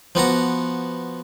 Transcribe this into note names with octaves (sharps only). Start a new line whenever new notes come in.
F3 B3 F#4 A#5